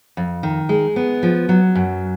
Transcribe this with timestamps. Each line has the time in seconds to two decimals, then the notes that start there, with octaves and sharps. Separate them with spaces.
0.17 F2
0.43 D#3
0.69 G#3
0.96 B3
1.23 F3
1.49 F#3
1.75 F#2